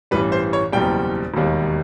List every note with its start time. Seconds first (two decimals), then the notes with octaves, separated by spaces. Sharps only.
0.11 A1 G2 E3 G3 B4
0.32 C5
0.53 C#5
0.72 F#1 E2 B2 G3 G5
1.34 E1 D#2 D#3 G3